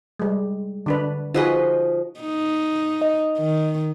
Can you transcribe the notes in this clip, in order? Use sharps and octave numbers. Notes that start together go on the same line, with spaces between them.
G3 G#3
D3 D4 B4
F3 D#4 F#4 G#4 B4 D#5
D#4
D#5
D#3